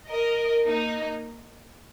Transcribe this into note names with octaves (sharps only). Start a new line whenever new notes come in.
A#4 D#5
A#3 D#4